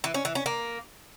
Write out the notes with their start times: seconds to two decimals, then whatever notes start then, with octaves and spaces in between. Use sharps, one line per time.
0.04 E3
0.14 C#4
0.25 E3
0.35 C#4
0.46 A#3